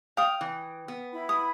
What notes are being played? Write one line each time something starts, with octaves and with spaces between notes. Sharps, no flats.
F5 G5 D#6
E3
B3
E4 B5
D#6